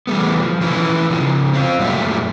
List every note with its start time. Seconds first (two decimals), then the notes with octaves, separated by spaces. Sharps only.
0.07 E3 G3 A3 B3
0.42 F3
0.61 E3 F3 C#4 E4 B4
1.10 C#3 F3
1.54 C4 F4
1.79 F#2 A#2 G3 A3 E5